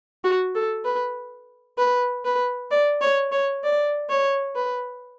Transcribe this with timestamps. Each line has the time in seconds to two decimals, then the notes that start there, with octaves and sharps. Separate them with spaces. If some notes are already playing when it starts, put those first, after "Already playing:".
0.24 F#4
0.55 A4
0.85 B4
1.78 B4
2.25 B4
2.71 D5
3.01 C#5
3.32 C#5
3.64 D5
4.09 C#5
4.55 B4